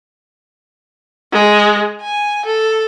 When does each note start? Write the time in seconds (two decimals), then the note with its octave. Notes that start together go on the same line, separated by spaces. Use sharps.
1.33 G#3
2.02 G#5
2.45 A4